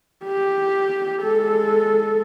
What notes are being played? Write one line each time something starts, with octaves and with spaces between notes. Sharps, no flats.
G4
G#3 A4